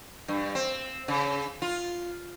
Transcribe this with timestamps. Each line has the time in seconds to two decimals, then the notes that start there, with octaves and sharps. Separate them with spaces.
0.28 G2
0.55 C4
1.08 C#3
1.62 F4